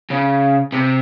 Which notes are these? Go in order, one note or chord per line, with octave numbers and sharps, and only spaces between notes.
C#3
C3